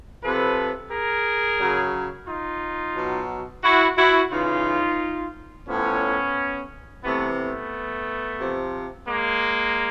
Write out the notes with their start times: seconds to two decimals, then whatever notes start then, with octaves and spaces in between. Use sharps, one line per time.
0.23 C3 F3 A4 B4
0.91 G#4 A#4
1.59 C#3 F#3
2.27 D#4 F4
2.95 B2 F#3
3.63 E4 F#4
3.97 E4 F#4
4.31 C#3 E3 D#4 F4
5.67 A2 F3 B3 C#4
7.03 C3 E3 A3 B3
7.37 A3 B3
8.39 C3 F3
9.07 G#3 A#3